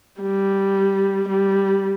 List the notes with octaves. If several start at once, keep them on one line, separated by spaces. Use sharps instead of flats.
G3
G3